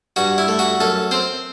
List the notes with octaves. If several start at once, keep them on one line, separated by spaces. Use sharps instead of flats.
G2 F#4
E4
A3
F#4
F#2 A4
C4 C5